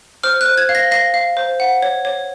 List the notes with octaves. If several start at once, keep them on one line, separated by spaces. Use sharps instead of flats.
C5 F6
F#6
C5
G#6
F5
A#6
F5 A#6
F5
C5
F#5
C#5
C#5